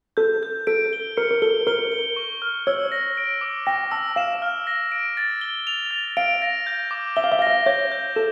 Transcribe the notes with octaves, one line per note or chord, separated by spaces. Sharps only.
A4 G6
G6
A4 D7
G7
A#4 C#7
A#4
A4 G7
A#4 G7
G7
C#6
F6
C#5 E6
A#6
D7
D6
G5 A#6
A5 E6
F5 E7
F6
A#6
D7
A6
G7
F7
A6
F5 D7
A#6
G6
D6
E5 G7
F5
E5
F5
A#6
E5
C#5 G6
G6
A4 E7